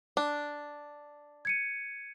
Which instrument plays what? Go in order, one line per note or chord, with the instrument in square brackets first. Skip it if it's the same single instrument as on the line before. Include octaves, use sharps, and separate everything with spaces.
[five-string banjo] D4
[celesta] G#6 C#7 D#7